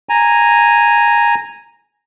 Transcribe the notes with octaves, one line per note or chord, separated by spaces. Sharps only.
G#5 A#5